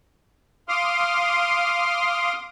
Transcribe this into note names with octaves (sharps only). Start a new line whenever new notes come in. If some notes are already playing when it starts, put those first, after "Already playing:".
F5 C6 D6 D#6 F6